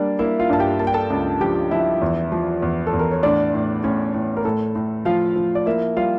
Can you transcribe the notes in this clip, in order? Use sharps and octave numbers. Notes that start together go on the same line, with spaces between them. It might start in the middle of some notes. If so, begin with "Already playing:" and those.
Already playing: G3 A#3 D4 D5
A#3 E4 E5
F4 F5
G2 A5
G4 G5
A#3 A5
G5
A4 A5
C#2
F3 G4 G5
F3 E4 E5
E2
F3
E2
A4
E2
A#4
C#5
A2 D4 D5
A2
A2 C#4 C#5
A2
A#4
A2 A4
A2
F3 F4 F5
F3
D5
A#3 E4 E5
G3 F4 F5